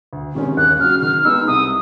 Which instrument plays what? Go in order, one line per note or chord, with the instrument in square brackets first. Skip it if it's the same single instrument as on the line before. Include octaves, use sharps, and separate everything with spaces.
[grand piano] D2
C3 D#3 G#3 C#4
[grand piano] D#2 [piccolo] F#6
[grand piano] C#3 F#3 [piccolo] F6
[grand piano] D#3 [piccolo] F6
[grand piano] G#3 B3 D#4 [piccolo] E6
[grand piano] C2 [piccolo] D#6